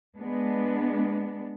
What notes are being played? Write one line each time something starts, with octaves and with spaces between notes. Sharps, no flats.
G#3 B3 D4